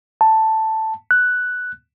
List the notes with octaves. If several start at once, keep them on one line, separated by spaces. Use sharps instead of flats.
A5
F#6